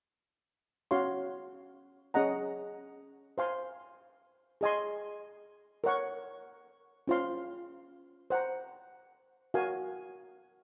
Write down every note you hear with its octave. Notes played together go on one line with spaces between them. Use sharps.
C#4 F#4 C#5 F5 C6
C#4 G#4 D#5 F#5 A#5
C5 F5 G#5 C6
G#4 D#5 G#5 C6
A#4 C#5 F#5 C#6
C#4 F4 C5 F5 C6
C5 F#5 A#5
F#4 A#4 F5 G#5